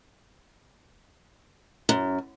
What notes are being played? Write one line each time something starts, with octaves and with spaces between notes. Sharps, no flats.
F#2